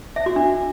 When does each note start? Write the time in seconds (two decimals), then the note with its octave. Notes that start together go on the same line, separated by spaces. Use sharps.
0.16 E5
0.26 F#4
0.36 D4